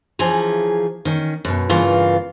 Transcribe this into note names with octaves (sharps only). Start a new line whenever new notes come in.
C#3 E3 F3 C#4 G#4 A#5
D#3 C#4
F#2 B2
E2 G2 C#3 E3 F4 A#4